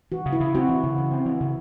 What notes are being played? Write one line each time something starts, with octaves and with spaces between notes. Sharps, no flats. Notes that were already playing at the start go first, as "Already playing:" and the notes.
E3 F#4
C#3
E4
C#3
C4 F#4
E3
C#3
C#3
C4
E3
C#3